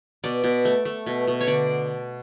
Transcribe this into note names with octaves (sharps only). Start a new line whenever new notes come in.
B2 D5
B2
A3
A3
B2
B2
C#5
D3 D5